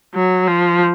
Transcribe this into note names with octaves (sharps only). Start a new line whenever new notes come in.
F#3
F3